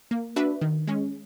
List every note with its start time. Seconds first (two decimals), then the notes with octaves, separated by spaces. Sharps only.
0.11 A#3
0.36 D4 F#4 B4 E5
0.61 D#3
0.87 G#3 C#4